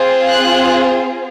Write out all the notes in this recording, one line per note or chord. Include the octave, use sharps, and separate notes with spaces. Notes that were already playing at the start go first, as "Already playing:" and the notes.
Already playing: C4 F4 G#4
F#6